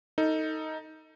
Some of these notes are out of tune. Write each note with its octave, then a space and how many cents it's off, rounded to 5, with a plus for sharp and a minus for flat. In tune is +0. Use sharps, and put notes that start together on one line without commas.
D#4 +15 A4 +30